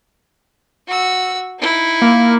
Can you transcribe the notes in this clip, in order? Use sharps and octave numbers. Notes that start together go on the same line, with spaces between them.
F#4 E6
D#4 E4
A#3